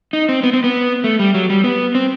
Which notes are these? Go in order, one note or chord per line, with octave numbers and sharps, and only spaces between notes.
D#4
C4
B3
C4
B3
A3
G3
F#3
G3
B3
C4